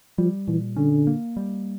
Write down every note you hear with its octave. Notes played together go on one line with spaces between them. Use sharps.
F3 G3
A#2 E3
D3 C#4
A#3
G3